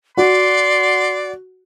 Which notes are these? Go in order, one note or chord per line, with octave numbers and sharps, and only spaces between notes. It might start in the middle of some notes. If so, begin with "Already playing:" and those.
F#4 D5 C6